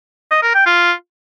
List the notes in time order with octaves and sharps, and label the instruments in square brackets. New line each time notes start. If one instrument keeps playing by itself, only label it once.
[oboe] D#5
A#4
G5
F4